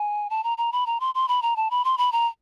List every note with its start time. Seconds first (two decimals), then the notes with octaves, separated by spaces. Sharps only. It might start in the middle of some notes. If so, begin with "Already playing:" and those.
Already playing: G#5
0.30 A5
0.44 A#5
0.58 A#5
0.72 B5
0.86 A#5
1.00 C6
1.15 C6
1.28 B5
1.42 A#5
1.56 A5
1.71 B5
1.84 C6
1.98 B5
2.12 A#5